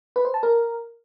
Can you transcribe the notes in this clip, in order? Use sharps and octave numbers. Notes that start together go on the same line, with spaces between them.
B4
C5
A5
A#4